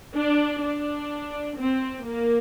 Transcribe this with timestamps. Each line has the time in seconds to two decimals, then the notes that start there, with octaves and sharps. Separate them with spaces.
0.15 D4
0.62 D4
1.58 C4
2.06 A#3